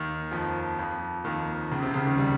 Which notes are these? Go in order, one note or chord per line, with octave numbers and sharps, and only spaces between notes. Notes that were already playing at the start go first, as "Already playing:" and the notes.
Already playing: D#2 D#3
F2 F3
F2 F3
D#2 D#3
C#2 C#3
C3
C#2 C#3
D#2 D#3
G3